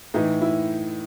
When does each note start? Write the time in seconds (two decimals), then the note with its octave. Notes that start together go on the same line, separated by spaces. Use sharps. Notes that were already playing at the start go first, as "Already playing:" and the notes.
0.14 A2 E3 D#4
0.41 E4